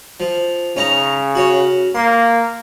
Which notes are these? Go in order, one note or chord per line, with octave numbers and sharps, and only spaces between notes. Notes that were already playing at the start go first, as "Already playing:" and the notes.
F3
C#3 C#4 D#4 A#5
C#4 F#4
A#3 C6